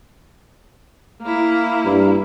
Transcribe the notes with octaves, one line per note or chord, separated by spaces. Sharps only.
A#3 E4
G2